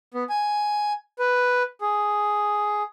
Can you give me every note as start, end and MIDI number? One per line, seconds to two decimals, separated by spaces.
0.14 0.24 59
0.29 0.93 80
1.19 1.63 71
1.81 2.83 68